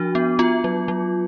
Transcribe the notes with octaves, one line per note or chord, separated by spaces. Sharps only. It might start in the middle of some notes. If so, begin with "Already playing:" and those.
Already playing: F3 D4 F#4
B3
B3 F4
F#3
F#3